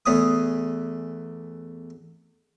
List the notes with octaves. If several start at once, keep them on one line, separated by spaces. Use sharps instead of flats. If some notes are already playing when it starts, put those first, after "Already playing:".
E2 A3 G#5 D#6